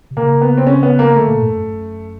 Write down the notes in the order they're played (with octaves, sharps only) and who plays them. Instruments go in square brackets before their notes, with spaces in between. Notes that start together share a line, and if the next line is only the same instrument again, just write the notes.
[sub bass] C3
[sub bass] C#3 [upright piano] A#3
[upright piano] B3
C4
C#4
B3
A#3
[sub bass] D3 [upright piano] A3
[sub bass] A#2
G2
F#2